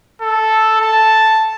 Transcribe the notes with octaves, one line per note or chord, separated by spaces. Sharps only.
A4
A5